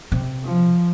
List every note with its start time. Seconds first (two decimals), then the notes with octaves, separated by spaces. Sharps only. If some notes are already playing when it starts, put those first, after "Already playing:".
0.12 C3
0.44 F3